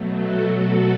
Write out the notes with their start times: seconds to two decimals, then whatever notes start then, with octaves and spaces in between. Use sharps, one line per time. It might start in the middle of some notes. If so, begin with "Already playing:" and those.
Already playing: B2 F#3 A3
0.18 F#4 A4
0.54 F#4 A4